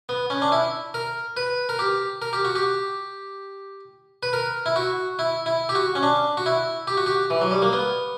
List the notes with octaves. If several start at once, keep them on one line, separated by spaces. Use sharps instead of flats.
B3
C#4
D4
E4
A#4
B4
A#4
G4
A#4
G4
F#4
G4
B4
A#4
E4
F#4
E4
E4
G4
F#4
C#4
D4
F#4
E4
G4
F#4
G4
E3
F#3
G3
A#3
B3